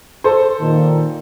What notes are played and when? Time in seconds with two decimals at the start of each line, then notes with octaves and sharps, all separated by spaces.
0.24 A4 C5
0.60 A#2 D#3